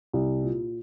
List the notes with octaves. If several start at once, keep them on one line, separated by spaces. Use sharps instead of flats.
C2
A#2